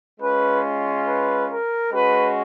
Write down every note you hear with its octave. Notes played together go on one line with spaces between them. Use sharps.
G#3 C#4 F4 B4
B4
A#4
G#3 C#4 F#4 B4